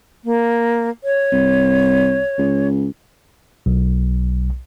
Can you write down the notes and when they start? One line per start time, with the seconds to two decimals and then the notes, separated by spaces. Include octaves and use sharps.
0.25 A#3
1.04 C#5
1.32 C2
2.38 C#2
3.66 B1